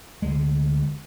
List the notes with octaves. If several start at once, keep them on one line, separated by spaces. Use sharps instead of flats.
D2 G#3